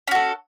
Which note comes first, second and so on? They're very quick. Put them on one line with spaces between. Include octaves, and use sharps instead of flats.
C#4 F#4 A4